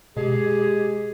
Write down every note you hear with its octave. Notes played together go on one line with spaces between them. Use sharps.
B2 G#3 G4 G#4